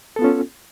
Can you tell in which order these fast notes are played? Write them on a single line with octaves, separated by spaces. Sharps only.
A4 B3 F4 C#4